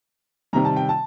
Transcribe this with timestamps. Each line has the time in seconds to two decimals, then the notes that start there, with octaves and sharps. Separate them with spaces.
0.53 C3 D#3 G3 A#5
0.65 A5
0.76 G5
0.89 A5